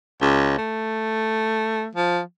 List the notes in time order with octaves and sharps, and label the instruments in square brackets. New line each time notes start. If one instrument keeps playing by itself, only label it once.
[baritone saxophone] C#2
A3
F3